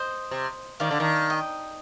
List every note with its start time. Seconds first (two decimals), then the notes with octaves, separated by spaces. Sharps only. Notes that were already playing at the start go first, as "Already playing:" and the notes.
Already playing: C5 D#5
0.31 C3
0.80 D#3 D5 F5
0.91 D3
1.00 D#3
1.30 D#5 G5